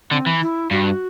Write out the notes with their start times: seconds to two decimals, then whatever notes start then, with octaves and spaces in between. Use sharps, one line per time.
0.11 D3 C4
0.26 E3
0.41 E4
0.71 G2 F#4